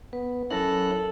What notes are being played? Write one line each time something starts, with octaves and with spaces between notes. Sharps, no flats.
B3 B4
F#3 C#4 E4 A4 A#4 F#6